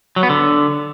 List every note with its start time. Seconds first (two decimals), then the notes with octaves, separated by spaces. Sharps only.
0.16 F#3
0.23 B3
0.29 D3